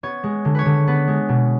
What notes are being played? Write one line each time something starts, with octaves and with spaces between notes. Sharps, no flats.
B3 C#5
G#3
D3
B4 C#5
D3
B3 B4
G#3
B2